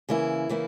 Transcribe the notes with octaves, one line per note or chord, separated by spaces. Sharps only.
C#3 E3 A#3 E4
C#3 E3 A#3 E4